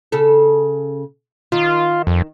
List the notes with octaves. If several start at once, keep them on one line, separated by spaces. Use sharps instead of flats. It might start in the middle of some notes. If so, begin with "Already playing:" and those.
C#3 A4
D#3 F4
F2